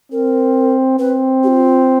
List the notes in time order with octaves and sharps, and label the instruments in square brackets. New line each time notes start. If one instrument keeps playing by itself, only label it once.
[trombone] C4 [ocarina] A#4
[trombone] C4 [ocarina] B4
[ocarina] G4
F4